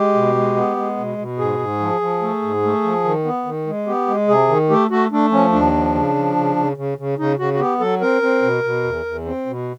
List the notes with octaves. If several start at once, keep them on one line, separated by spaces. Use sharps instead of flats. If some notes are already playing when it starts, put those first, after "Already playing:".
Already playing: G#3 G4
B2
G#3
B3
G#3
B2
B2
G#2 G#4
G#2
F3
F3
A3
G#2
A3
F3
D#3
B3
D#3
G#3
B3 G4
G#3
C3 G#4
D#3
A3 G4
A3 F#4
A3 D4
F3 C#4
D#2 D4
F3
C#3
F3
C#3
C#3
C#3
C#3
C#3 D#4
C#3 F#4
F#4
B3 G4
F#3 A4
C4 A#4
C4
B2
B2
E2
E2
C4
B2